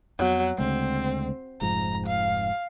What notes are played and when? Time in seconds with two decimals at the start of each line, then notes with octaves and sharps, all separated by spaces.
0.19 F2 F#3 B3
0.58 D2 C#3 G#3 C4
1.61 F1 G#2 F3 A#5
2.07 F5